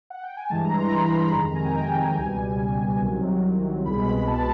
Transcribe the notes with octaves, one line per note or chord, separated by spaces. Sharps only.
F#5
G5
G#5
G2 E3 G#3 A5
A#5
C6
B5
F2 C3 D#3 G#3 A#5
A#5
G#5
G5
G#5
G#5
C#2 B2 G3
C2 C3 D#3 F#3
C2 B2 G#3 B5
A5